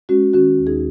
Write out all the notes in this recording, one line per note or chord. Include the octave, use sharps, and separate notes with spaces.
G#3 C#4 F#4
D#3 C#4 F#4
D#2
D#4 G#4